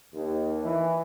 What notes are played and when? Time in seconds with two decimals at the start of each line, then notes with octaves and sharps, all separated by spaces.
0.14 D#2
0.64 E3